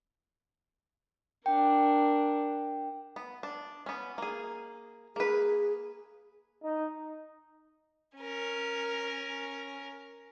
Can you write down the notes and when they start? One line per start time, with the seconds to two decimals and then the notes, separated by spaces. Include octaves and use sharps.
1.46 D4 A#4 G5
3.16 B3
3.43 D4
3.86 B3 C#4
4.18 A#3 G#4
5.16 A#3 G#4 B4
6.62 D#4
8.17 C#4 A#4